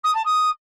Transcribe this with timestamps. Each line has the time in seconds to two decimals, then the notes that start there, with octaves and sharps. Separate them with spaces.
0.04 D#6
0.14 A5
0.25 D#6